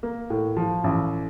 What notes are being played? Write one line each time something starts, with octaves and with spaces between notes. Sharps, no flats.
A#3
A2
F3
A1